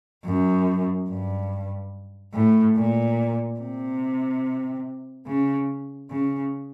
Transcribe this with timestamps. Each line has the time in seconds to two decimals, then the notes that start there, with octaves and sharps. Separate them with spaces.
0.25 F#2
1.09 G2
2.34 A2
2.76 A#2
3.60 C3
5.27 C#3
6.10 C#3